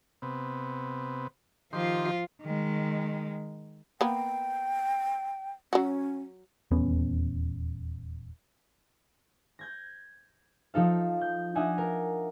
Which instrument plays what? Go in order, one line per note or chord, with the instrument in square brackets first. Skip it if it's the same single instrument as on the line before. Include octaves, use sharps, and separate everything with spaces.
[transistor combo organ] C3 B3
[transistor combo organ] D#3 G4 C6 [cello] F3 F4
[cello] D#3 G#3
[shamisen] A#3 B3 [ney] G5
[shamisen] F#3 F#4 [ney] C#4
[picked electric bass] D#1 E2 B3 C#4
[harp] G6 G#6 A#6
F3 D#4 A4 F5
G6
D4 D#4 E5 F#5 G#5
A#4